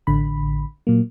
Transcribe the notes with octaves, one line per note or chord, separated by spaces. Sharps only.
A1 D3 B5
A#2 F#3 A#3